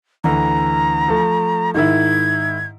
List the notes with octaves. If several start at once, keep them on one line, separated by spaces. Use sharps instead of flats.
D2 E3 A#5
F3 A3
G#2 D#3 E4 G#6